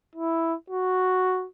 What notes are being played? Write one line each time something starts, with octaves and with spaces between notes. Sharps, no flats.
E4
F#4